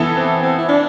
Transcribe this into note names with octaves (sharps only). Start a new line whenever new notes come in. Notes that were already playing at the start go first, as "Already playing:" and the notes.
Already playing: E3 B3 E4 A4
C4
C4
E4
D4